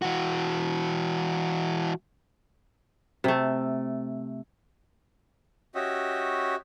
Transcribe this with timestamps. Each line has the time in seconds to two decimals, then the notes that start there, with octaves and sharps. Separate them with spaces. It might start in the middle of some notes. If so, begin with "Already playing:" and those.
0.02 E3 F#4
3.24 C3 A3
5.75 C#4 F#4 G4 D#5 E5